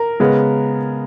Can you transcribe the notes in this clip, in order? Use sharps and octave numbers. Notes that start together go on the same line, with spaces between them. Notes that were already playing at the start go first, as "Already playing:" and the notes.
Already playing: A#4
C#3 G#3 B3